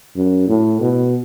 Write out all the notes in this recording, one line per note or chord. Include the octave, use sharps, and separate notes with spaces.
F#2
A2
B2